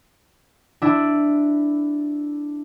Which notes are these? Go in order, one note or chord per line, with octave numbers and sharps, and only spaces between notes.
D4 E4